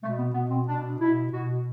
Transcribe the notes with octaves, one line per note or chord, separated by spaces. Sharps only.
B2 A3
B3
B2 B3
C4
B2 D4
B2 E4
B2 F#4